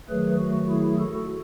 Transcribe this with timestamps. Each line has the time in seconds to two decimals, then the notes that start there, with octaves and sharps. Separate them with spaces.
0.09 D#3 F#3 A3 G#4 B4
0.39 F#4
0.69 E4 G#4
0.99 F#4 A4